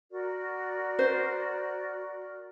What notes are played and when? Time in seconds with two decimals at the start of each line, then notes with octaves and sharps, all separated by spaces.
0.11 F#4 A#4 D5
0.99 C5